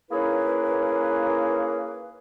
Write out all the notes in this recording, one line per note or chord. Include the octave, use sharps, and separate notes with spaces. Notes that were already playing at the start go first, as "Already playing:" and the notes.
A#3 C#4 D#4 E4 G#4 B4